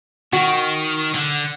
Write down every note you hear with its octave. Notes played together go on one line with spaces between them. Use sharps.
D#3 F#4
D3